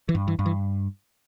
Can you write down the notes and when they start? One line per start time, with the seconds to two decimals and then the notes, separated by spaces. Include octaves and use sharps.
0.09 E3
0.15 G2
0.28 E3
0.39 G2
0.46 E3